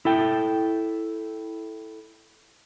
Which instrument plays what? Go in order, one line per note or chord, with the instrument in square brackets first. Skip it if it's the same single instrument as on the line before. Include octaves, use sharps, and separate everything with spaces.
[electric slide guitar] E4 A4 G5